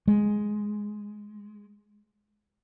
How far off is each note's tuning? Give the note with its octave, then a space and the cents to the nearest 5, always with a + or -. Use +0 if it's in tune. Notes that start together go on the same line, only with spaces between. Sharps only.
G#3 +5